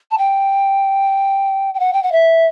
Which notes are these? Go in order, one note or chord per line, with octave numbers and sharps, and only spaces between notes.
A5
G5
G5
F#5
G5
F#5
E5